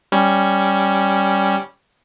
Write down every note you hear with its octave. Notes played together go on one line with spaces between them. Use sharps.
G3 C#4